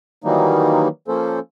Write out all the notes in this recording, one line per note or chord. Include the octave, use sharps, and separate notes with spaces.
D#3 E3 F#3 G3 A#3 D#4
F3 A#3 C#4 A4 C5